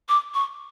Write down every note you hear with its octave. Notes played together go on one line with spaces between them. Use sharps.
D6
C#6